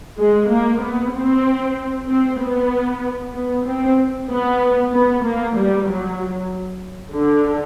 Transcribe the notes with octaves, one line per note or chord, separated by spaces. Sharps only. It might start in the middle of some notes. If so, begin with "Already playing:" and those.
G#3
A#3
B3
C4
C4
B3
B3
C4
B3
B3
A#3
G3
F#3
D3